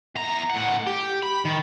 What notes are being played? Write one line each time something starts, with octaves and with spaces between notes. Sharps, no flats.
E2 A#5
A2 F#5
G4
B5
D#3